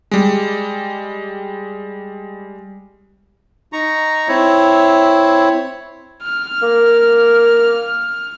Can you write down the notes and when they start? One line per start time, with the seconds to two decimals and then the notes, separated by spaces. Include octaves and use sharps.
0.11 G3 G#3
3.73 D#4 A#5 C#6
4.28 C4 E4 C#5
6.23 F6
6.63 A#3